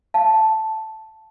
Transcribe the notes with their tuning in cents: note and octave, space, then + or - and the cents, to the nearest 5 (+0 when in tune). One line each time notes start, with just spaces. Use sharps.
F5 +0 A5 +0